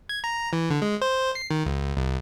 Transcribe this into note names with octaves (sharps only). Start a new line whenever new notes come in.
G#6
A#5
E3
D3
G#3
C5
C7
D#3
C#2
C2